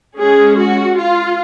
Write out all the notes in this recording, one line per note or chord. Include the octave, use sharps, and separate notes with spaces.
G#3 C#4 G#4
F#4
F4